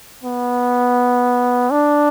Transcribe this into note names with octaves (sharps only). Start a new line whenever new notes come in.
B3
D4